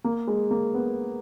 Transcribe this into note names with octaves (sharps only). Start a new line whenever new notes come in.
A#3
G#3
A#3
B3